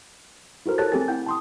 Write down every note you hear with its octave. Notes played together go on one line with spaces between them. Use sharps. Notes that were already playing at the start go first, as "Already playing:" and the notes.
E4 F#4 A4 A#4 C5
G4 A4 C#5 A5 F#6 A6
A3 C4 G4 A4 G#5 A6
E4 F#5 G5 G6
A5 C6 D#6